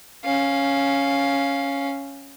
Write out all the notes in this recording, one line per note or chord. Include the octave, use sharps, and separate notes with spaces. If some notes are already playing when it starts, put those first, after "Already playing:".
C#4 F5